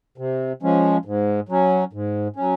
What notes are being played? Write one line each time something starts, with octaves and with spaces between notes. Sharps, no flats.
C3
F3 G#3 C#4
G#2
F#3 C#4
G#2
F#3 C#4